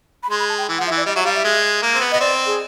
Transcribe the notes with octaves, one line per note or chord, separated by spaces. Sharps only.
B5
G#3 C6
B5
A5
G5
E3
F3 F#5
E5
E3
D5
G3 D#5
F#3 E5
G3 F5
E5
G#3
A#3
C4
B3
B3 D#5
C4 D5
G#4